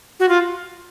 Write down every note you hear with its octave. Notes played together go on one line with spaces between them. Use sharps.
F#4
F4